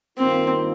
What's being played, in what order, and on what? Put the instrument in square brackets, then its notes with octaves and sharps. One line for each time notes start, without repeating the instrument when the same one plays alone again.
[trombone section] G2 D#3 A#3 F4 [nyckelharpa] C4